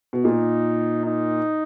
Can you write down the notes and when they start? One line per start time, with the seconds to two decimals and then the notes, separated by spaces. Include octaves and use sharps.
0.13 B2
0.25 A#2 D#4
1.06 D#4